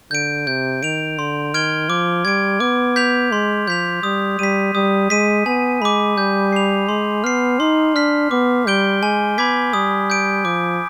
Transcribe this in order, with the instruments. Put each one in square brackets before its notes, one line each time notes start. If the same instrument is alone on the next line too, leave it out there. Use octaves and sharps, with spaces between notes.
[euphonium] D3 [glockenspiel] G6 D7
[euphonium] C3 [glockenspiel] G6
[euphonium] D#3 [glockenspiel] D7 F7
[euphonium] D3 [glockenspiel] C6
[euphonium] D#3 [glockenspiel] F6 G#6 D7 G7
[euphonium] F3 [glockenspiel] D6
[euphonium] G3 [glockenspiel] G#6 D7
[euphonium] B3 [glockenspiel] D6
[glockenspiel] G6 B6 F7
[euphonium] G#3 [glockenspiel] C6
[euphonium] F3 [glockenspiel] G6 B6 F7
[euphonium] G3 [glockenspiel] D#6
[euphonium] G3 [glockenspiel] B6 D#7
[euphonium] G3 [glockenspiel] D#6
[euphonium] G#3 [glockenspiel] B6 D#7
[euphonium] B3 [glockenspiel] G#5
[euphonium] G#3 [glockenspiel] B5 D6
[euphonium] G3 [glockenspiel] G6
[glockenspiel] C7 F7
[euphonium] G#3 [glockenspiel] C6
[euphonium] B3 [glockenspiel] F6 C7
[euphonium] D#4 [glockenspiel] C6
[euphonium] D4 [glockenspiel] F6 B6
[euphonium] B3 [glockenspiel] D6
[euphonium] G3 [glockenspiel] G6 D7 G7
[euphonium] G#3 [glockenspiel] G#5
[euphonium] B3 [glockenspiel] B5 D6 G#6 B6
[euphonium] G3 [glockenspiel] D#6
[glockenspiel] G6 D7
[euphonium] F3 [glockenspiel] D6